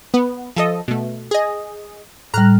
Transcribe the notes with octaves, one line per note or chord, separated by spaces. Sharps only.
B3
F3 A4 D#5
B2 A3
G#4 D#5
A2 G3 A#5 F6 F#6